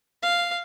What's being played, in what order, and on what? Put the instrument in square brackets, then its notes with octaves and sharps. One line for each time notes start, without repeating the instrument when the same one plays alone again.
[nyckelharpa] F5